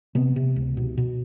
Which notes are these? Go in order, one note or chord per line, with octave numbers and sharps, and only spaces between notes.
C3 B3
C3
C#2
B2
B2